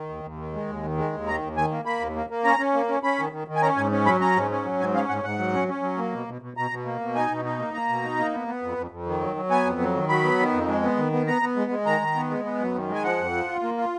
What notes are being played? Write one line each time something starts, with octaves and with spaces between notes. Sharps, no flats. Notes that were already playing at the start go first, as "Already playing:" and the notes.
Already playing: D#3
D#2
D#2
D#3
G#3
D#2
D#3
G#3
D#2
D#3 A#5
D#2
D#3 G#5
A#3
A#3 B5
D#2
A#3
A#3
C#4 A#5
C#4
A#3
C#4
C#4 B5
D#3
D#3
D#3
G#5
C#4 A#5
G#2 G#5
C#4
F#3 B5
C#4 A#5
G#2
C#4
F#3
G#2 G#5
C#4 F5
G#2 F#5
G#2 F#5
F#3
C#4
C#4
F#3
A#3
B2
B2
B2
B2 A#5
B2
A#3
B2
D#4 G#5
B2
D#4
A#3
A#3 A#5
B2
D#4
A#3
B3
B3
F2
F2
F2
D#3
F#3
F#3
B3 G#5
F2
F#3
D#3
F#3 B5
B3
D#3
F2
G#3
B3
D#3
B3
B3 A#5
B3
G#3
G#3
D#3 A#5
D#3
B3
G#3
B3
F#2
D#3
G#3
G#5
F3 F#5
F2
F3
F4
A#3
F4